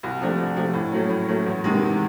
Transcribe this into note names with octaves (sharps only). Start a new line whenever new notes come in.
C2
C3 F3 A3 D4
C2
C3 F3 A3 D4
A2
F#3 A3 C#4
A2
F#3 A3 C#4
E2
C3 D#3 G#3
E2